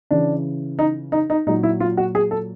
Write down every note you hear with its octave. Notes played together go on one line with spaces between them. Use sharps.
C#3 E3 D4
D#4
D#4
D#4
A#2 F#3 D#4
E4
F4
F#4
G#4
A4